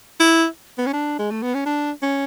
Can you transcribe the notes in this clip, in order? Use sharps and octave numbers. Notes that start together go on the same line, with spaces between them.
E4
B3
C#4
D4
G#3
A3
B3
C#4
D4
C#4